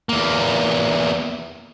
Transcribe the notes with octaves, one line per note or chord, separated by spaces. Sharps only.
E2 A#3